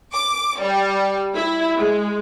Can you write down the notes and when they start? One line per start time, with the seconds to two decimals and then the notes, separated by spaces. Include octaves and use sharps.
0.13 D6
0.60 G3
1.35 E4
1.76 G#3